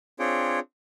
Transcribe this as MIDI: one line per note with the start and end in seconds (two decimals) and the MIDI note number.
0.19 0.60 60
0.19 0.60 62
0.19 0.60 65
0.19 0.60 68
0.19 0.60 73
0.19 0.60 79